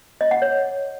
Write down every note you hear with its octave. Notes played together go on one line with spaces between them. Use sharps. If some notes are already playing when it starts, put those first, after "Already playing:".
D#5
F#5
C#5